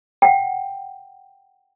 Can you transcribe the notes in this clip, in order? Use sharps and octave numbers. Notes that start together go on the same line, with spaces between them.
F#5 G5